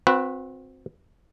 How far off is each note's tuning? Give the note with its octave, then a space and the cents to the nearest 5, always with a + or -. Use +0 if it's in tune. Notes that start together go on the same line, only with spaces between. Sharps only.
C4 +0 F#4 -35 B4 +0